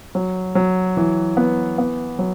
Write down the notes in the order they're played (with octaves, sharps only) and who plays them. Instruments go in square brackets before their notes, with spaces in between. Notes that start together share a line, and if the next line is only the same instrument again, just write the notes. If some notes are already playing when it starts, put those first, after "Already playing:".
[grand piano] F#3
F#3
E3
B3
B3
F#3